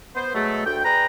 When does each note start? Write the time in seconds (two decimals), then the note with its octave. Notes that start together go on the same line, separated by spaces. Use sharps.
0.15 B3 C5
0.34 B2 F#3 G#3 A3
0.65 D2 G5
0.85 G#4 B4 D5 G5 A#5